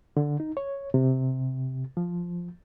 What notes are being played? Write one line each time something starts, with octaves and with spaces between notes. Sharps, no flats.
D3
D#4
C#5
C3
F3